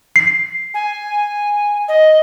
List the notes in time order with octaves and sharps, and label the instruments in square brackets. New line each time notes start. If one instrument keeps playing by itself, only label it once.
[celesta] C7
[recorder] G#5
D#5